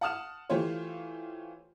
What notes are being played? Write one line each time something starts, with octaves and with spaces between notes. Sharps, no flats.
F#5 A5 D#6 F6 E7
E3 A3 F4 G4 C5 C#5